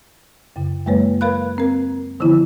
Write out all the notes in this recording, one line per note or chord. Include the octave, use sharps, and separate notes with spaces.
F#2 C#3
F#2 F#3 G#3 A#3 B4 C#5
A#4 B4 F5 B5 F#6
C4 A#4
D3 D#3 F3 B3 E4